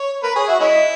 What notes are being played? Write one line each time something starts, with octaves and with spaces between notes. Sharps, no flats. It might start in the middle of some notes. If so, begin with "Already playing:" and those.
Already playing: C#5
A#4 B4
G#4 C#5
F#4 E5
G#3 C#4 E4 D#5